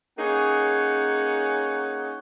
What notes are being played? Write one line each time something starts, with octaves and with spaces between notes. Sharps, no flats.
A#3 C#4 D#4 G#4 C#5 F#5